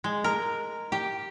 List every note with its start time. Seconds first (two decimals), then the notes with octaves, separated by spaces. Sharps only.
0.04 G#3
0.24 A#4
0.92 G4